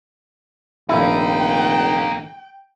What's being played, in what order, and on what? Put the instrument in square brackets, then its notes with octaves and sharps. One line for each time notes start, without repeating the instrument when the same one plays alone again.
[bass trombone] F1 [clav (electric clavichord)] A#1 E4 [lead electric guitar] A#3 D#4 [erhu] G5